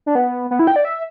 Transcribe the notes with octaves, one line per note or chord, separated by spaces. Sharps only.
D4
B3
B3
E4
G5
D5
E5